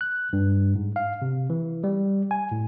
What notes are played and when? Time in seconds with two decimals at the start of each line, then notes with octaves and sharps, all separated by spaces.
0.01 F#6
0.33 G2
0.76 G#2
0.96 F5
1.22 C3
1.50 E3
1.84 G3
2.31 G#5
2.52 A2